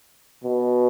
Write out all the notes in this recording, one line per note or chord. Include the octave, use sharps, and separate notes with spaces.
B2